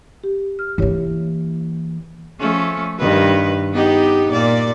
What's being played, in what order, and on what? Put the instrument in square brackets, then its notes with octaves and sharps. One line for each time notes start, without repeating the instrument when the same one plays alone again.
[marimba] G4
F6
[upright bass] E3 A#3 [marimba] E4 G4 C#5
[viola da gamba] F3 A3 C#4
G2 D#3 B4
B3 D#4 G4
A#2 D5